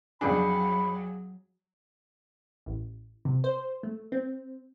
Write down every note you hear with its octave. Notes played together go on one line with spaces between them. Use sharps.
F2 C#3 F#3 D4 G#4 B5
A1
C3
C5
A3
C4